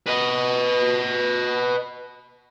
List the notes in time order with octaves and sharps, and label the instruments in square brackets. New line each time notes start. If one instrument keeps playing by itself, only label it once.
[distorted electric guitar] B4 D#5